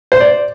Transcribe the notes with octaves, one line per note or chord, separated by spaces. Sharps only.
C5
D5